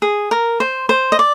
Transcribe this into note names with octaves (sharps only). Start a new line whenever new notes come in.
G#4
A#4
C5
C5
D#5
D5